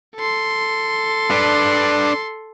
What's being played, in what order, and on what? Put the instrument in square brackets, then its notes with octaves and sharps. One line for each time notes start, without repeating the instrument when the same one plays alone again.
[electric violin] A4 C6
[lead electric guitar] D4 B4